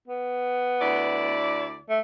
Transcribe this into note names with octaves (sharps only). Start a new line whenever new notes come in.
B3
D2 E4 D5
A3